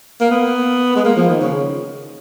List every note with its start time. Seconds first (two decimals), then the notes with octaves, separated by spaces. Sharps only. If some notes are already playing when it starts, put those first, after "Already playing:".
0.21 A#3
0.31 B3
0.96 G#3
1.05 A#3
1.16 F3
1.29 D#3
1.41 C#3